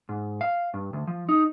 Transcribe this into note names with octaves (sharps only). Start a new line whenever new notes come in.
G#2
F5
G2
D2
F3
D#4